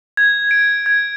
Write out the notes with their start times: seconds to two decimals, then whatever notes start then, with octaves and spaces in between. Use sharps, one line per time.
0.17 G#6
0.51 D7
0.86 G#6